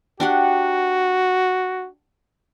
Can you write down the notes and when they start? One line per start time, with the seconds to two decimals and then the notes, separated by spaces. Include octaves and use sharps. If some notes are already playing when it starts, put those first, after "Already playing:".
0.20 D4 F#4 G4 F#5